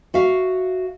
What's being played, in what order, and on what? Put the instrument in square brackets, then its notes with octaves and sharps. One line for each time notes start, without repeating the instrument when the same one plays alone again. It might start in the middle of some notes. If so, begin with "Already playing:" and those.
[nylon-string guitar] F#4 E5 F5